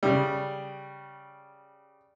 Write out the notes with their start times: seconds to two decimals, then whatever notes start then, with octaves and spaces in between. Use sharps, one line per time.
0.03 C#3 G3